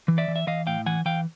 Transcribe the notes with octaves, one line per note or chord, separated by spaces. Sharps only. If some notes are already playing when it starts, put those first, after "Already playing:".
E3
D5 E5
E3
E5
E3 D#5 F5
A2 F5 G5
E3 F#5 G#5
E3 F5 G5